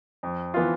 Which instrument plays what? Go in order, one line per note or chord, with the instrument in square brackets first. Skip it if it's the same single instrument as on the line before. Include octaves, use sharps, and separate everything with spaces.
[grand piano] F2
E3 B3 F4